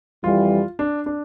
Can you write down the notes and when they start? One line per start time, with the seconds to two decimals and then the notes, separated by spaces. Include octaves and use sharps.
0.24 F2 E3 G3 F4
0.79 D4
1.06 D4